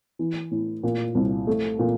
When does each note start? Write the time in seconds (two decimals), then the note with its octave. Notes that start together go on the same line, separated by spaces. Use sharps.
0.19 E3
0.51 A2
0.83 A#2
1.15 C2
1.47 A3
1.79 A#2